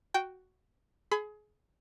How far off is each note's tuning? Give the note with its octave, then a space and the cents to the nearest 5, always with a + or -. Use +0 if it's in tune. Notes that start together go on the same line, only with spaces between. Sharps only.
F#4 +5 G5 -10
G#4 +25 B5 +40